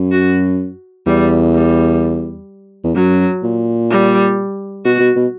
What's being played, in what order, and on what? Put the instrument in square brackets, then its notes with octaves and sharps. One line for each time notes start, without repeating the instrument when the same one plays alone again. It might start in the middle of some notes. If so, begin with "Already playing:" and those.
Already playing: [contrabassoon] F#2
[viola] F#4
[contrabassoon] E2 [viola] G3
[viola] G3
[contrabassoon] E2
[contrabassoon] F#2 [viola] F#3
[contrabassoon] A#2
[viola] G3
[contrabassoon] B2 [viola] F#4
[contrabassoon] B2
B2